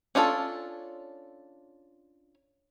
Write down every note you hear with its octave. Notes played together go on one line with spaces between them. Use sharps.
C#4 D4 F4 F#4 A4